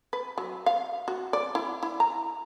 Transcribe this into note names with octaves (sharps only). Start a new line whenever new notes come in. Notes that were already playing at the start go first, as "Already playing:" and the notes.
B4
F#3
F5
F#4
D5
E4
E4
A#5